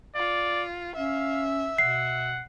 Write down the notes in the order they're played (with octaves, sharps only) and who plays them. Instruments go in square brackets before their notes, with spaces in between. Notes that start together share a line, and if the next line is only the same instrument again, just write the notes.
[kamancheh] F4 [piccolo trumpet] D5
[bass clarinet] C#4 [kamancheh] E5 [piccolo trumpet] F5
[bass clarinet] B2 [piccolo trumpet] F#5 [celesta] C7